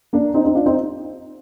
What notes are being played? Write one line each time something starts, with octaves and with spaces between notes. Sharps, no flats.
A#3 D4
C4 D#4
C4 D#4
D4 F4
C4 D#4